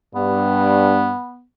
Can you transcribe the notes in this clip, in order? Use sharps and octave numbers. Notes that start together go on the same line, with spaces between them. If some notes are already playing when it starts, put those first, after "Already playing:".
G2 B3